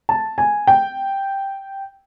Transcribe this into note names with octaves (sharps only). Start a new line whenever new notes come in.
A5
G#5
G5